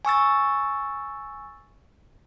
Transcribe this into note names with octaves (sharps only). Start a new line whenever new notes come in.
G#5 C#6 E6 A6